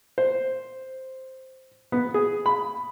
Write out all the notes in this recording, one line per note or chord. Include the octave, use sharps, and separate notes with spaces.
C5
B3
G#4
B5